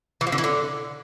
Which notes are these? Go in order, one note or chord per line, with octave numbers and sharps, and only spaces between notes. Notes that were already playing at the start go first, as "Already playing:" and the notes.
E3
F3
D3
E3
D3